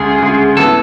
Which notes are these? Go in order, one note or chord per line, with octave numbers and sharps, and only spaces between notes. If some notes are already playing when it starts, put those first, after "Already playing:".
Already playing: D2 C#3 G#3 G#4
D2 C#3 G#3
A1 E3 B3 A4